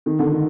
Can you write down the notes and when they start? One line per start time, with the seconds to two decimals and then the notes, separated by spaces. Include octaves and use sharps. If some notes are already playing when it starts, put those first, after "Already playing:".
0.06 D#3
0.19 D3
0.32 D#3